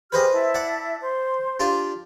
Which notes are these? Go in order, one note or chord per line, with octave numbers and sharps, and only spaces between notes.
G4 G#4 B4 C5 D#5 F6
E4 E5 A5
D5 F#5
C5
D4 F4 G4